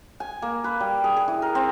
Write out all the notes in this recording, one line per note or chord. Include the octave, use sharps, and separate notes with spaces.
G#5
A#3
B4
G3
G#4
G#4
E3
A#4
C4